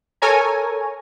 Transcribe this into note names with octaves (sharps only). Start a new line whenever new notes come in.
A4 A#4 C#5 G#5 A#5